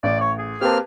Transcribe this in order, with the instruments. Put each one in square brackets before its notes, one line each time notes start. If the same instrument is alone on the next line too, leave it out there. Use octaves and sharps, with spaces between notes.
[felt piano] A1 [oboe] D5
[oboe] C#5
G#4
[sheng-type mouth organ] A#3 C4 F6 [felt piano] G4 B4 A5